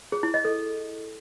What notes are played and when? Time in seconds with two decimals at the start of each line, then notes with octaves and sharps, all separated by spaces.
0.12 G#4
0.23 E4
0.34 D#5
0.45 A4